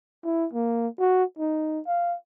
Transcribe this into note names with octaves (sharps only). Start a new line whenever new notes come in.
E4
A#3
F#4
D#4
F5